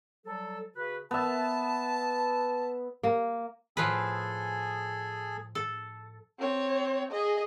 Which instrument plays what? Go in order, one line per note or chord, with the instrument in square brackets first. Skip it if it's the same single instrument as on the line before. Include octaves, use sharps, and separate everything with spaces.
[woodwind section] F#3 G3 A4
C#3 F#4 B4
[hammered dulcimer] B3 E5 [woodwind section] A5
[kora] A#3
[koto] A2 F3 B4 [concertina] G#4 A4 G#5
[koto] A4
[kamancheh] C4 C#5
G#4 D#5